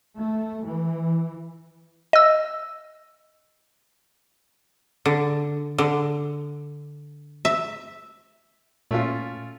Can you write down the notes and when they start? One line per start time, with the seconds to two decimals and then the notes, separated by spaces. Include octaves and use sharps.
0.15 A3
0.64 E3
2.13 D#5 E6
5.06 D3
5.78 D3
7.45 E5
8.91 A#2 A3 C#4 F4